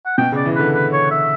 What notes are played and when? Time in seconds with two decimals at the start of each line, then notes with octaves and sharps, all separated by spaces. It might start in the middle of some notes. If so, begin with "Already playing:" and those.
0.06 F#5
0.18 B2 G5
0.32 C#3
0.36 D5
0.45 E3
0.55 D3 B4
0.74 B4
0.92 C#5
1.11 E5